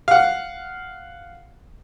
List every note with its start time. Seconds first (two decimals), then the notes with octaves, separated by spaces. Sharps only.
0.08 F5 F#5